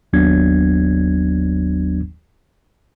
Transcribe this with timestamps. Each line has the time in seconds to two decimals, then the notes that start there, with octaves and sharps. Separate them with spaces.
0.13 G1 D#2 F#3 B3 D4 G#6